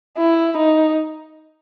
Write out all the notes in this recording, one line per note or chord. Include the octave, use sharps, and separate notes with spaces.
E4
D#4